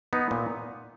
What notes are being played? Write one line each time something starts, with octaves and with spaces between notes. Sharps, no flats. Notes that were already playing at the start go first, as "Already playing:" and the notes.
B3 D#4
A#2